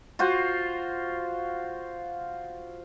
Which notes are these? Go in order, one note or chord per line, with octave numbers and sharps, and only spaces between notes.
F4 F#4 C5